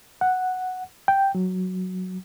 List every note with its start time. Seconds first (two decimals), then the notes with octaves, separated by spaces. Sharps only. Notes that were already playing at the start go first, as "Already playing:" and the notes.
0.21 F#5
1.08 G5
1.35 F#3